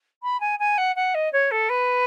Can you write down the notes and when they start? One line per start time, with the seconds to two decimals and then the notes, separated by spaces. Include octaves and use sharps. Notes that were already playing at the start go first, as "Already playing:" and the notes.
0.23 B5
0.40 G#5
0.59 G#5
0.78 F#5
0.95 F#5
1.14 D#5
1.32 C#5
1.51 A4
1.69 B4